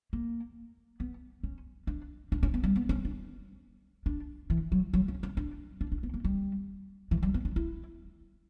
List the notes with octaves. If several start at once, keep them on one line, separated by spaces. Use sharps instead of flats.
A#3
B3
C#4
D4
D4
C#4
B3
G3
B3
C#4
D4
D4
E3
F#3
F#3
C#4
C#4
D4
D4
D4
B3
A#3
G3
E3
G3
B3
D4
E4